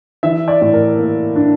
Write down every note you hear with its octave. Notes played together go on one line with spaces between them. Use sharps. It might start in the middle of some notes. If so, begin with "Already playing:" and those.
E3 E5
D5
A2
A#4
A#3
D4